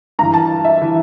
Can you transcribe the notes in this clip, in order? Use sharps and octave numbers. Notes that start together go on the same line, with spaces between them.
G2 E3 A#5
A5
E5
E3